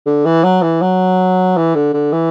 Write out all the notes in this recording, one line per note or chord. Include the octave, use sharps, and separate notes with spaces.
D3
E3
F#3
E3
F#3
E3
D3
D3
E3